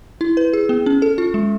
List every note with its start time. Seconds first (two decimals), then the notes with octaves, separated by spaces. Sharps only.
0.21 E4
0.37 B4
0.53 G#4
0.69 B3
0.86 C#4
1.02 A4
1.18 F4
1.34 G#3